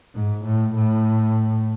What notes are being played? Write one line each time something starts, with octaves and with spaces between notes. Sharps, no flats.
G#2
A2
A2